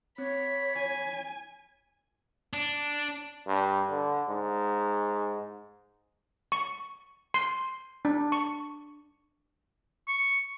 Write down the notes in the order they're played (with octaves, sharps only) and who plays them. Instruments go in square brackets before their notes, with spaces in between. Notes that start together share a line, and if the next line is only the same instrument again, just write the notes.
[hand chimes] C4 [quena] C#5 [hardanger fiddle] B5
[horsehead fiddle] G#5
[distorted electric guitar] D4
[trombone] G2
D3
G#2
[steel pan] C#6
C6
D4
C#6
[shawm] C#6